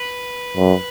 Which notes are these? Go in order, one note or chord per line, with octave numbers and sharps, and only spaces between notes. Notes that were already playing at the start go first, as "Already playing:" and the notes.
Already playing: B4
F#2